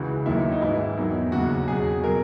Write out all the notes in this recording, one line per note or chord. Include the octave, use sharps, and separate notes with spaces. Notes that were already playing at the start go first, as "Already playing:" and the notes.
Already playing: C#2 C#3 E3 F#4
D#2 D#3 F#3 E4
D#4
G#2 E3 E4
E2 D#3 F#3
D#2 C#3 F#3 F#4
E2 B2 F#3 G#4
B2 F#3 A#4